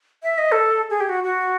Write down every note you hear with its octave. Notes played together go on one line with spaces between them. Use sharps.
E5
D#5
A4
G#4
G4
F#4
F#4